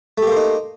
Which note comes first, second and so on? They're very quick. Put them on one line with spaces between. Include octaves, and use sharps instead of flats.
A3 G4 A#3 C5 D#4